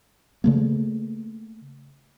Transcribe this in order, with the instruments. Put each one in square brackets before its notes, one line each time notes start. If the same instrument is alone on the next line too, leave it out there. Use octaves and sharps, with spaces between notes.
[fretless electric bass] C#3 A3 A#3